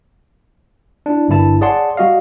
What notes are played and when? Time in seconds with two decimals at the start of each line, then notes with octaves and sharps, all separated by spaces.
1.06 D4 E4
1.28 G1 G2 E4 A5
1.61 G#4 C#5 D5 F#5 A5 C6
1.97 G3 F#4 D#5 F5